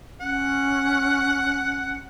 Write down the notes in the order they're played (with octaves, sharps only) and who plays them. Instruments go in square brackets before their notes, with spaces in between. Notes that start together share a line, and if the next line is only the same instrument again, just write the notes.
[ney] C#4 [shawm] F#5